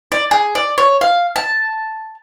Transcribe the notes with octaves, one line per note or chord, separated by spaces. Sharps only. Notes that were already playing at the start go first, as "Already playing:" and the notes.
D5
G#4
D5
C#5
F5
A5